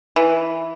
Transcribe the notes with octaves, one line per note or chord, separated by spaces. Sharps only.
E3